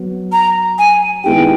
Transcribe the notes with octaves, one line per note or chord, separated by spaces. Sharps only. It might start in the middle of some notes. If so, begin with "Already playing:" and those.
Already playing: F#3 B3
A#5
G#5
D#3 G#3 B3 E4 G4 G5